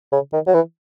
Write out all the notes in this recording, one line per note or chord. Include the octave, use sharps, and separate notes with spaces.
C#3
D#3
F#3
E3